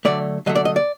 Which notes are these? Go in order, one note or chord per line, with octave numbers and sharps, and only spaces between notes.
D3 F#3 A3 D5
D3 F#3 A3 D#5
D5
D#5
D5